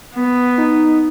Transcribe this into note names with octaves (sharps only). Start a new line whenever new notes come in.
B3
D#4